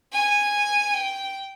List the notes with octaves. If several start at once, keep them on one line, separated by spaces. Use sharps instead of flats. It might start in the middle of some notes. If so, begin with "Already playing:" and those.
G#5
G5